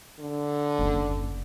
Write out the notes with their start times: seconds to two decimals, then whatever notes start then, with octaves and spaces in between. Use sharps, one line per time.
0.20 D3
0.79 F#1 D#2